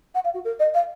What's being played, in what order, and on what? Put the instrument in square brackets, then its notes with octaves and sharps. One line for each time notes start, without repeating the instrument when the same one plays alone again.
[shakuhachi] F#5
F5
F#4
A#4
D#5
F5